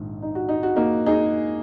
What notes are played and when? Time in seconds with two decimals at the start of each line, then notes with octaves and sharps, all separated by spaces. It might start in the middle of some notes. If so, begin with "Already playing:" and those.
Already playing: A#1 G#2 D#3
0.22 D#4
0.35 F#4
0.49 D#4
0.63 F#4
0.76 A#3 D#4
1.06 D#4 G#4